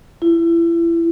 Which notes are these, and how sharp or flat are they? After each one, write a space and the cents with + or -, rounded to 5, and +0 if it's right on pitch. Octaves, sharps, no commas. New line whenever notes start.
E4 +30